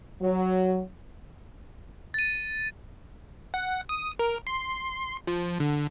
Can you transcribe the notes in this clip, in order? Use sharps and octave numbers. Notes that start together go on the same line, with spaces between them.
F#3
A6 D#7
F#5
D#6
A#4
C6
F3
D3